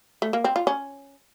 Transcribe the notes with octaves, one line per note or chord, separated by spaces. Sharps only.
A3
A#3
C4
F4
C#4